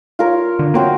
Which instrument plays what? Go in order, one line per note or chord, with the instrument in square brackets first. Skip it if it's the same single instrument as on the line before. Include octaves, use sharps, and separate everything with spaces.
[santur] F4 A#4 C#5
[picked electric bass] D3
[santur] F#3 C4 D6 [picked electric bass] A#3